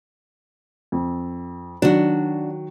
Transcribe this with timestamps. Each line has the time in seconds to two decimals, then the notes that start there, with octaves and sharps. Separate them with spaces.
0.92 F2
1.82 D#3 F#3 D4 F#4